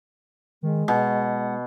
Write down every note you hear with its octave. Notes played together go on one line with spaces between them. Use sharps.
D#3 G#3
B2 F#5